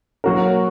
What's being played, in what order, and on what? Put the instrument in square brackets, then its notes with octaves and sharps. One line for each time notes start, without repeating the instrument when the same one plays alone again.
[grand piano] F#3 A#3 F#4 A#4